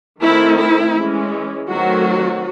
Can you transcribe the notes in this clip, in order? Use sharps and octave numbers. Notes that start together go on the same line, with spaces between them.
D#3 A3 C4 E4
E4
E3 G#3 C#4
D#3 F#3 A3 C4 F#4